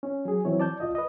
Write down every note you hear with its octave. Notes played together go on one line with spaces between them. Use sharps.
C#4
F#3 G#4
E3 F#3 C4 E4 C#5
D5 A5 G6
C2 F4 D#5
B4 D#5